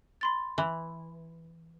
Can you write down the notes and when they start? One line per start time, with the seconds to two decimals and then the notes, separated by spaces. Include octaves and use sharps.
0.21 B5 C6 A6
0.58 E3